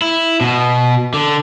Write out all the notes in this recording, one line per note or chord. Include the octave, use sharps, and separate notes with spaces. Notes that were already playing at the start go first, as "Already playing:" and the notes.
E4
B2
D3